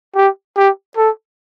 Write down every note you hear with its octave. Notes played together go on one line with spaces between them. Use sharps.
G4
G4
A4